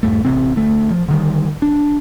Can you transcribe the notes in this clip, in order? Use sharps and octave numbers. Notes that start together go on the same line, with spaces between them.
D#1 G2 A3
A1 C3 C4
D2 A3
F3
D3 D#3 G3
D4